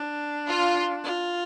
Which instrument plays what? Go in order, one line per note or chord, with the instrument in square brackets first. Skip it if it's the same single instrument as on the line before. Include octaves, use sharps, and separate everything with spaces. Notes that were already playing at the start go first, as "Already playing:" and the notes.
Already playing: [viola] D4
[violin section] F4
[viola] F4